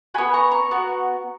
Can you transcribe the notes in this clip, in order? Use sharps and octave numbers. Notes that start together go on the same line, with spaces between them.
B3 F#4 G#5 B5
A#5 C#6
A#5 C#6
B3 F#4